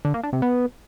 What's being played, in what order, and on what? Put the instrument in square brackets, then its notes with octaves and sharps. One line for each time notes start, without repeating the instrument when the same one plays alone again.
[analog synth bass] D3
A#3
D4
C3
B3